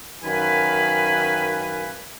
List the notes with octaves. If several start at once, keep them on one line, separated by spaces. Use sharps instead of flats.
F#2 D#3 B4 F5 G#5 B5